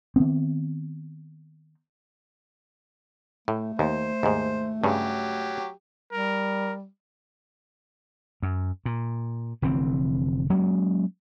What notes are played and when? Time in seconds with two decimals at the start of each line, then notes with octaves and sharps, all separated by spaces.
0.16 D#3 B3 C4
3.48 A2 A3
3.79 D#2 C5
4.23 D#2 G#2
4.84 G2 C#3 F#3 G4
6.13 G3 A#4
8.42 F#2
8.85 A#2
9.62 F1 D3 E3 C4
10.50 F#3 G#3 A#3 C#4